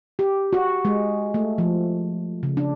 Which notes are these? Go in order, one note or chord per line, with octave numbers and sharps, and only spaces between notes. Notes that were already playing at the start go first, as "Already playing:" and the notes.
G4
F#4
G#3
A3
F3
C#3
D4